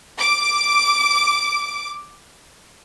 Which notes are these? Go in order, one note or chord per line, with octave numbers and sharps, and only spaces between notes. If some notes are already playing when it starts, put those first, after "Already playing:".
D6 D7